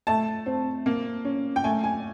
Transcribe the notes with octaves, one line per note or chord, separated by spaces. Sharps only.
A3 A5
C4
A#3
C#4
G5
A3 G#5
G#5